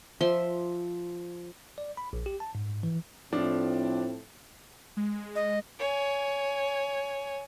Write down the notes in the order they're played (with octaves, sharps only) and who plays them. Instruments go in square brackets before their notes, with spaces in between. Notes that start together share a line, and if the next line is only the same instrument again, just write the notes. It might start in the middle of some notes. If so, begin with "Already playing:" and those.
[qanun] F3 E5 C6
[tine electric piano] D5
B5
A#1
G4
A5
G#2
E3
[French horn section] A2 C4 [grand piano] F3 D4
[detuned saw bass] G#3
[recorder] D#5
[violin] C#5 G#5